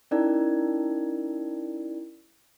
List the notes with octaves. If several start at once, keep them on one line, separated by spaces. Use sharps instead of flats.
C#4 D#4 E4 A#4 D5